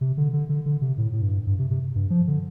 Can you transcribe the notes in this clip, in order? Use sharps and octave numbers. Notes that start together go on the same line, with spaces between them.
C3
D3
D3
D3
D3
C3
A2
A2
G2
G2
C3
C3
G2
F3
D3